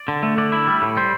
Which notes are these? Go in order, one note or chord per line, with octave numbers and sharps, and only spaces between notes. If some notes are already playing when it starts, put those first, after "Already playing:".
Already playing: D5
D3
A3
D3 D5
E4
G3
A2
G3 C5